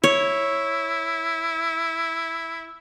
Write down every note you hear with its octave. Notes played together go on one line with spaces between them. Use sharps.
E4 C#5